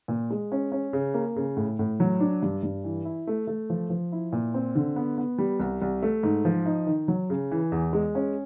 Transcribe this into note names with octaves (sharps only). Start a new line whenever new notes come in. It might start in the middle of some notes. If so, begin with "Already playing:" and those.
A#2
G#3
C#4
C#4
C#3
A#3
C#3
A2
A2
F#3
D4
G2
G2
E3
E4
A3
A3
F3
F3
E4
A#2
C4
D3
B3
B3
G3
C2
C2
A3
G#2
F3
D#4
D#3
F#3
C#3
E3
E2
G#3
C#4